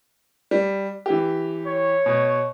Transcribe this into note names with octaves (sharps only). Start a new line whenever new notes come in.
G3
E3 G4
C#5
B2